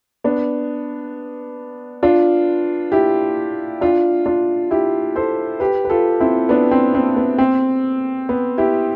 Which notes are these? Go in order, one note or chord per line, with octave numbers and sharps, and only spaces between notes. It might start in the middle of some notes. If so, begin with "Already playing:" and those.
B3 D4
D4 F4
E4 G4
D4 F4
D4 F4
E4 G4
A4 C5
G4 B4
B4
F4 A4
C4 E4
B3 D4
C4
C4
B3
C4
B3
E4 G4